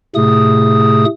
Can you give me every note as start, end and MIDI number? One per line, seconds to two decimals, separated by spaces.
0.15 1.05 45
0.15 1.05 48
0.15 1.05 57
0.15 1.05 68
0.15 1.05 87